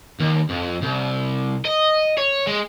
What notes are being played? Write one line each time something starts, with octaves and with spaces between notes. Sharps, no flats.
D#2
F2
C2
D#5
C#5
G#3